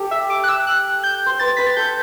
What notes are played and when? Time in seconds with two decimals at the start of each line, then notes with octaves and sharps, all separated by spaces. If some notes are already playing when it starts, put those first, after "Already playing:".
Already playing: G4 A4
0.11 E5
0.30 D6
0.44 F#6
0.49 E6
0.67 F#6
1.04 G6
1.26 C5
1.40 B4 A6
1.57 B4 B6
1.67 A6
1.77 A4 G6